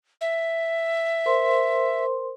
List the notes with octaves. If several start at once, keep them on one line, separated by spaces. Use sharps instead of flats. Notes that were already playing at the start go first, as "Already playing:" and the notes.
E5
A#4 C5 C6